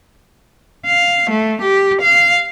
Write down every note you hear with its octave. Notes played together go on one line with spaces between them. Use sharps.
F5
A3
G4
F5